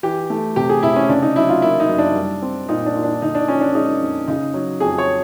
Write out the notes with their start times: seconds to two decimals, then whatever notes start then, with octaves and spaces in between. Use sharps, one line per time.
0.03 E3 G4
0.30 A3
0.56 C3 G4
0.69 G#4
0.83 C3 E4
0.96 C#4
1.09 C#3 D4
1.23 D#4
1.36 F#3 E4
1.49 F4
1.62 A#3 E4
1.80 D#4
1.89 F#2
1.98 D4
2.16 G3
2.42 C4
2.69 A#2 D#4
2.86 D4
2.95 A#2
3.04 D4
3.22 D3 D#4
3.35 D4
3.48 F3 C#4
3.61 D4
3.75 G#3 D#4
4.01 F2
4.28 C#3 D#4
4.54 F#3
4.80 F2 G#4
4.98 C#5